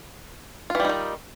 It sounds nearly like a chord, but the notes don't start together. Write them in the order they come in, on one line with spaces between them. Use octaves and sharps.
F4 E3 G3 D#4 D#3